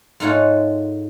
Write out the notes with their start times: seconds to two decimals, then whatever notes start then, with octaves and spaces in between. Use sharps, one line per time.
0.20 G#2 A3 D#4 F4 C#5 F#5